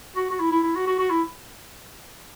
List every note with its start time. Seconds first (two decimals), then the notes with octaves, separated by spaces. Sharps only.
0.17 F#4
0.31 F#4
0.39 E4
0.51 E4
0.63 E4
0.75 F#4
0.87 F#4
0.99 F#4
1.10 E4